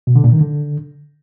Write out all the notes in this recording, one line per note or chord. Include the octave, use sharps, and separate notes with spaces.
B2
D3
A#2
D#3
D3